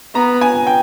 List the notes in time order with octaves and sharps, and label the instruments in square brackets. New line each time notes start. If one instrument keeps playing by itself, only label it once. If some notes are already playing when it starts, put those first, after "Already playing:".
[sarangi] B3 [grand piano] A#5
[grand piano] G#5
G5